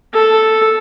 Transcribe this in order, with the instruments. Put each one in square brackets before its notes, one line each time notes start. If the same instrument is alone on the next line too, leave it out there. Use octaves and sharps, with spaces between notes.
[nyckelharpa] A4